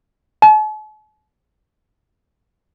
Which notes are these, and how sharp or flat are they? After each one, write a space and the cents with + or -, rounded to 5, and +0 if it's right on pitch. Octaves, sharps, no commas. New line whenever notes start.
A5 -45